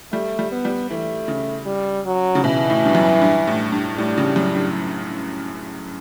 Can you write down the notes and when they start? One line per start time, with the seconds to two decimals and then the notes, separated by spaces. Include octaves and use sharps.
0.12 G3 A3
0.39 G3
0.52 B3
0.65 G3
0.90 E3 A3
1.28 C#3
1.66 G3
2.06 F#3
2.35 C#3
2.44 B2 E3
2.70 A2
2.85 G2
2.95 F#2
3.22 G2
3.47 A2
3.72 G2
3.97 A2 G3
4.17 C#3
4.36 F#2
4.55 G2